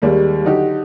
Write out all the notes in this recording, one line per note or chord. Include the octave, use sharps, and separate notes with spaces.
D#2 G3 G#3 A#3
D3 F#3 D#4 F#4 G4